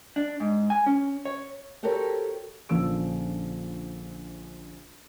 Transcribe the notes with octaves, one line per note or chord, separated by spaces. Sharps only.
D4
G#2
G#5
C#4
C#5
C4 F#4 G4 A4 A#4 C#5
A#1 D3 F3 C#4 E6 D7